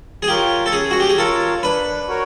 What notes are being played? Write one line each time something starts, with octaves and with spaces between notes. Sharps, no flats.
G#4
F4 G4 A#4 C#5
A4
C#4 G#4
F#4
G4
G#4
F4 A4 A#4 C#5
D4 B4
F#4 A#4 C#5